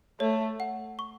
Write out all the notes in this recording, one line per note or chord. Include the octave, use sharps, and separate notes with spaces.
A3 C#5
F#5
C#6